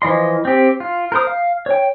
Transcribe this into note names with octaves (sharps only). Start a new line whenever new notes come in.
E3 F3 D#5 C6
C4 G4
F4
A#4 C5 D#6
F5
C#5 G5